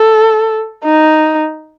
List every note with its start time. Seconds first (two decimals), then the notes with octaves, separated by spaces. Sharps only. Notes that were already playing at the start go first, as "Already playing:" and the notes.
Already playing: A4
0.85 D#4